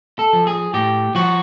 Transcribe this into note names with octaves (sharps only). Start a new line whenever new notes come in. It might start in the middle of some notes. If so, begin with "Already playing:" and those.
A4
F3
G#4
A2 G4
F3 F#4